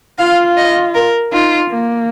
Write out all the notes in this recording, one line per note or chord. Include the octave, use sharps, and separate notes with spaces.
F4 F5
D#5
A#4
D#4 F4
A#3